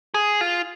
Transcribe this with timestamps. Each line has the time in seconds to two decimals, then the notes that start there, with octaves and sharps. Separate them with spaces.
0.14 G#4
0.41 F4